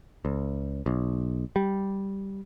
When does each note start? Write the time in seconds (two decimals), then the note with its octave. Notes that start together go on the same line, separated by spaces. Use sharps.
0.25 C#2
0.86 B1
1.56 G3